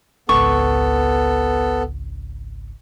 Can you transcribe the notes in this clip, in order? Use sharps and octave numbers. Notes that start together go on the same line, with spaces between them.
G#1 C#2 B3 A4 C#6